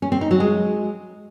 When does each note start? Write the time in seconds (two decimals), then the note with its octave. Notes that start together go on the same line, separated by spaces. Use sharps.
0.02 C#4
0.12 C4
0.21 D#4
0.31 F#3
0.40 G#3